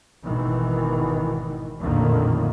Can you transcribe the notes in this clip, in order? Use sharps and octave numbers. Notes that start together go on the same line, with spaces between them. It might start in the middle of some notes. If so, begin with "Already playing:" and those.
G#1 B2 D#3 E3
A#1 F2 A2 D3 D#3 A#3